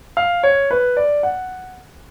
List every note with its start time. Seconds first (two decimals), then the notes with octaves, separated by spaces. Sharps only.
0.17 F5
0.43 C#5
0.71 B4
0.97 D5
1.23 F#5